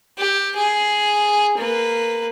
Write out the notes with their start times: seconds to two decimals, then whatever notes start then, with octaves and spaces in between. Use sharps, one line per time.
0.18 G4
0.56 G#4
1.57 A#3 B4